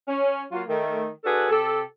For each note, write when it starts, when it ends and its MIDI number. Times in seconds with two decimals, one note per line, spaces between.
0.08 0.43 61
0.52 0.62 54
0.52 0.62 58
0.52 0.62 65
0.68 1.08 51
0.68 1.08 57
1.24 1.49 62
1.24 1.49 66
1.24 1.49 68
1.24 1.49 69
1.24 1.49 71
1.49 1.82 48
1.49 1.82 67
1.49 1.82 69